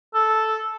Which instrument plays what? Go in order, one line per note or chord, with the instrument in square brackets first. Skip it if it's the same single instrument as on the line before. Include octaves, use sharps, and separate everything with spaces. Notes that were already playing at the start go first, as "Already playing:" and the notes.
[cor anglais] A4